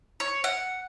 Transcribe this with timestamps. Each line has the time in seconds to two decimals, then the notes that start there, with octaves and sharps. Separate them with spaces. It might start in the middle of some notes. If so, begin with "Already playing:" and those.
0.20 C#5
0.44 F#5